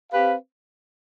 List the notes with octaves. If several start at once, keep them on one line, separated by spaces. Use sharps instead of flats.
C4 G4 B4 F5